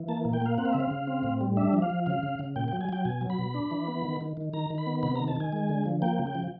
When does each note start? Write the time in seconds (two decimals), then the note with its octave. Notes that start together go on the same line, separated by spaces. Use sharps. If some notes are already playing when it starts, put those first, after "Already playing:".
Already playing: E3
0.08 A#3 A5
0.25 A#2
0.33 G5
0.42 A#3 F5
0.58 C4 F#5
0.65 F5
0.73 C#3 E5
0.80 F5
0.91 C#3
1.07 C4
1.24 A2
1.41 G3
1.57 D4 E5
1.73 F3
1.82 F5
1.90 F3
2.06 C#3 F5
2.23 C#3
2.39 C#3
2.56 A#2 G5
2.68 G5
2.72 F#3
2.81 G#5
2.89 F#3 G5
3.05 B2 G#5
3.21 F#3
3.30 B5
3.39 B2
3.54 D4
3.71 E3
3.88 B3
4.04 D#3
4.21 D#3
4.37 D#3
4.53 D#3 A#5
4.70 D#3
4.78 B5
4.87 B3
5.03 C3 B5
5.16 A#5
5.20 D#3
5.28 A5
5.36 D#3 G#5
5.52 G#3
5.69 D3
5.86 F3
6.02 A#3 G5
6.19 C#3
6.27 G5
6.35 F3